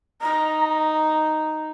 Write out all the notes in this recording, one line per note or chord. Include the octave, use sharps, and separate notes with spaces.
D#4 A#5